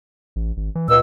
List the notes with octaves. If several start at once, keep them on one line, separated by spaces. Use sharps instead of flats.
A1
G#1
E3
C#2 A#2 E6